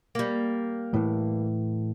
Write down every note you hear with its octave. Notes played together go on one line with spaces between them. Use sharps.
G3 A#3
A2 E3